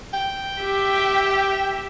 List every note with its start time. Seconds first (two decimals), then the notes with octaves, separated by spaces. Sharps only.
0.13 G5
0.60 G4 E5